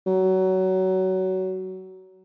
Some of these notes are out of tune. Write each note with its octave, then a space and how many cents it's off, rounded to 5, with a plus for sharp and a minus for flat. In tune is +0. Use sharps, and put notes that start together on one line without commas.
F#3 +20